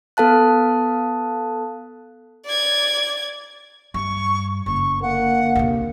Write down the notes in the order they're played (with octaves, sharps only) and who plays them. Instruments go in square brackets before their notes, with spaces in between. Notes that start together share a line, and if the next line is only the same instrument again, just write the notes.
[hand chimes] B3 A4 F5 A5 F#6
[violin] D5 G#6
[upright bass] G2 [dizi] C#6
[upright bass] F#1 [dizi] C#6
[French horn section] D3 A#3 A#4 [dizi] F#5
[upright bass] D#2 C3